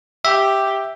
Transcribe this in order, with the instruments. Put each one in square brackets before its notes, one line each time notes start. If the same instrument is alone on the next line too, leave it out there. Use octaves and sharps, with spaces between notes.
[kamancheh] G4 [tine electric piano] E5